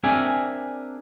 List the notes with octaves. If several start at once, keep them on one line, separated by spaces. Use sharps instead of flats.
C4 D4 G#4 A#4 E5 G#5